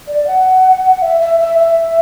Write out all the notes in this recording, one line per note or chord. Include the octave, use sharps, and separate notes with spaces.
D5
F#5
E5
E5
E5
E5